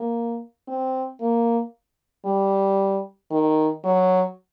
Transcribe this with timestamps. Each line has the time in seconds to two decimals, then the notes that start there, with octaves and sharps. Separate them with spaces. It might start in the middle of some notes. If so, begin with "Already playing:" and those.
Already playing: A#3
0.68 C4
1.21 A#3
2.26 G3
3.31 D#3
3.84 F#3